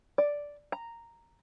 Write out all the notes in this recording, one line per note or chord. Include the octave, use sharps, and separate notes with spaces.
D5
A#5